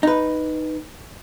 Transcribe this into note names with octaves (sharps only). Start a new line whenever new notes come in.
D#4 B4